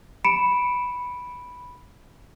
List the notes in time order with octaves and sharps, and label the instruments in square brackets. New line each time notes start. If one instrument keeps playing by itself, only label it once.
[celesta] B5 C#7 D7 E7